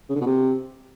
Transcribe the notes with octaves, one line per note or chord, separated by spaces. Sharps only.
C#3
D3
B2
C3